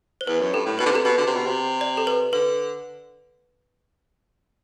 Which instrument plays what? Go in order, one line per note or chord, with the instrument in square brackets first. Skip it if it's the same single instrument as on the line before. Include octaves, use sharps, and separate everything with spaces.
[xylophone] C5
[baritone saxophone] E2 [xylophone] B4
[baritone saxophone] F#2
[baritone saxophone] G2 [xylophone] A4
[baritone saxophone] A2
[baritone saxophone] B2 [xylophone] B4
[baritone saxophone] D3
[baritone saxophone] C3 [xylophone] A4
[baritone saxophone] B2 [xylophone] B4
[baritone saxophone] D3
C3
B2
C3
[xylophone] D5
A4
B4
[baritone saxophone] D3 [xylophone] B4